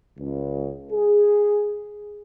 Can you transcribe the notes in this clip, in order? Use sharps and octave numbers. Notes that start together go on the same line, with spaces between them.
C#2
G#4